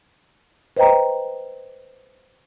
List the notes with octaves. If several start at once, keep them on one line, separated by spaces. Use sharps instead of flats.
B4 C5 D#5 G5 A#5